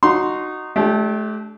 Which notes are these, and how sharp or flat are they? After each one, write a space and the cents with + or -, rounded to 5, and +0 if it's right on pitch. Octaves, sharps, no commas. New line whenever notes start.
D#4 -15 F#4 +0 C6 +0
A3 -35 D4 +0 G4 -5